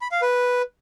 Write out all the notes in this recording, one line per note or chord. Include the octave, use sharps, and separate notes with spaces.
B5
F5
B4